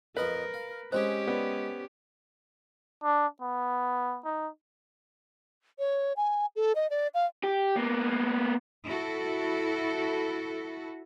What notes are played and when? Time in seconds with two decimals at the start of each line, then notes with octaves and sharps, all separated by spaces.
0.17 F2 A#4 B4 D#5 F5
0.54 F5
0.92 G#3 C4 C#4 G4 G#4 C5
1.28 B3 D5
3.04 D4
3.41 B3
4.25 D#4
5.79 C#5
6.16 G#5
6.56 A4
6.75 D#5
6.90 D5
7.14 F5
7.43 G4
7.76 A#3 B3
8.87 E4 F#4 A4